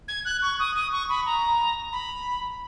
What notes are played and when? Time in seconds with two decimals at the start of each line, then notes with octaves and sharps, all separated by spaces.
0.08 G#6
0.25 F#6
0.42 C#6
0.59 D#6
0.75 D#6
0.93 C#6
1.09 B5
1.26 A#5
1.93 B5